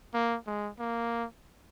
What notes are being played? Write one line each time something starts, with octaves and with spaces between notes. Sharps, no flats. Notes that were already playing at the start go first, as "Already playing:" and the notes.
A#3
G#3
A#3